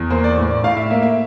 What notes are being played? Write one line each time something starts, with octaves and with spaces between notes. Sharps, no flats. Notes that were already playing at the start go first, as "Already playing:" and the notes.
Already playing: E2
A#3 C5
D5
A2
D5
A2 F5
E5
A#3 E5
E5